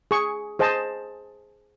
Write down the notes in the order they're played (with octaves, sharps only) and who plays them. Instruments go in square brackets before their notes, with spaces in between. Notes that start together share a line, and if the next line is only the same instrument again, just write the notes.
[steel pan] G#4 C#6
G#4 C5 D#5 A5